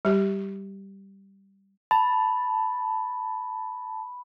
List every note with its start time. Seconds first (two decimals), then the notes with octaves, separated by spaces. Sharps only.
0.05 G3 G4
1.91 A5 B5